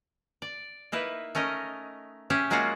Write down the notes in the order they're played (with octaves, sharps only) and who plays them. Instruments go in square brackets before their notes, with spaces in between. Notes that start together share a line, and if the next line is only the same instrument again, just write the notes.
[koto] D5
A#3 D#4 E4 B4
A3 C#4 A#4 D#5
C#4 G4 G#4 E5
F#3 G#3 A#3 C#4 F4 F#4